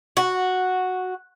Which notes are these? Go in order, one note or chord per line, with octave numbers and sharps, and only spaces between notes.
F#4